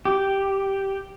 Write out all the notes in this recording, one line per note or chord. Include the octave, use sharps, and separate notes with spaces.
G4